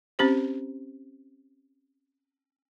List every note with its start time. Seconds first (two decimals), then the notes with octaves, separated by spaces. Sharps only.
0.19 C4 C#4 G4 C5